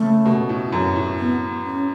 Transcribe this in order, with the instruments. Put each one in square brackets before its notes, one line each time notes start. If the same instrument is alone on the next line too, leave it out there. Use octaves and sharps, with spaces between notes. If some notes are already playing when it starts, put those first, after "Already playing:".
Already playing: [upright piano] C#3 [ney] A3
[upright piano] B2
A2
F#2
A2
[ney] B3
C#4